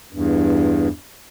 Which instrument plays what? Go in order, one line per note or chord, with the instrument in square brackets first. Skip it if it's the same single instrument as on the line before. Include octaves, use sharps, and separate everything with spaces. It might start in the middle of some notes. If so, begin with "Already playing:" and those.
[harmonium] E2 G2